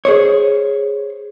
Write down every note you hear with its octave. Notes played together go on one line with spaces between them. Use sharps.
G#4 C5 C#5